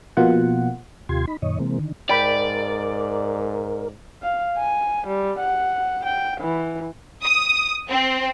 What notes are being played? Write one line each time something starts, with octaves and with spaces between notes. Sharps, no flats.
B2 F3 A#3 F4 F#5
D#2 C3 F4 G4 C6 G#6
D#4 B5
F#2 A#2 D#3 C#5 D#5
C3 E3 G#3 A#3 C4
D3 D#3
G#2 A#4 D5 G5 B5
F5
G#5
G3
F#5
G5
E3
D#6
C4